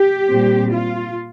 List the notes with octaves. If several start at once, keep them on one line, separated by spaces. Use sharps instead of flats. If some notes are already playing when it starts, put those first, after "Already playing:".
Already playing: G4
A#2 G3 C4
F4